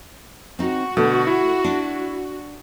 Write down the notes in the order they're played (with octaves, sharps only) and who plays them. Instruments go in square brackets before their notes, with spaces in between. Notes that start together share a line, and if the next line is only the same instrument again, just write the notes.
[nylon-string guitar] C4 D#4 [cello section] F#4
[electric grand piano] B2 D3 [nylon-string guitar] A3
[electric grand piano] E4
[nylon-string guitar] D4